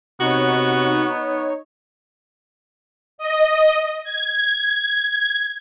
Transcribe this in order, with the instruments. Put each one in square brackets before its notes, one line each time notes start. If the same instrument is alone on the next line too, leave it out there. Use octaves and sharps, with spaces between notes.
[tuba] C3 [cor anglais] B3 [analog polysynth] D#4 C#5 [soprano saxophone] F#4
[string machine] D#5
G#6